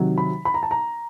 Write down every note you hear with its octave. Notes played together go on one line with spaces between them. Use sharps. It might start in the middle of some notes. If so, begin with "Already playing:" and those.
Already playing: C3 D#3 F#3
B5
B5
A#5
A5
A#5